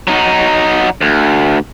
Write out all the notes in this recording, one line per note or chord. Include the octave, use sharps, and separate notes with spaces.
F#3 D#4
D2